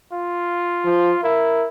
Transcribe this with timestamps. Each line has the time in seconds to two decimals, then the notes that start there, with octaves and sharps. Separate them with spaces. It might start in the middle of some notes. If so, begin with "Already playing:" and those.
0.12 F4
0.85 F3
1.24 E4 A#4